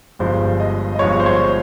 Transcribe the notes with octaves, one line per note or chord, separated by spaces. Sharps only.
G1 G2 F3 G#3 C5
D#5
D#5
G1 G2 F3 G#3 C#5
C5
C#5